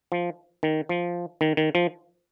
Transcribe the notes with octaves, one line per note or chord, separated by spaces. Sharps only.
F3
D#3
F3
D#3
D#3
F3